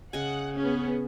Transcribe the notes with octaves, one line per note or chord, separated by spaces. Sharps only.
C#3 D#5 F#5 G#5
B3 C#4 G#4